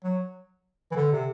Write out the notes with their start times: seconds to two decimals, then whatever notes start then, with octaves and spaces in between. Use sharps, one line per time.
0.04 F#3
0.91 E3
0.96 D3
1.12 C3